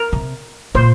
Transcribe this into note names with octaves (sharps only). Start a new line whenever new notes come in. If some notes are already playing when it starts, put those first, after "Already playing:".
Already playing: A#4
C3
A#2 C5